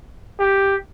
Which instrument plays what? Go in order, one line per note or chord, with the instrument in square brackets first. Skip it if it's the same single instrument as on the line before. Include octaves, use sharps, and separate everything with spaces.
[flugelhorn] G4